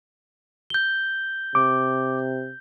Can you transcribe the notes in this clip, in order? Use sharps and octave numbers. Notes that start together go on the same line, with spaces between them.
G6 G7
C3 D6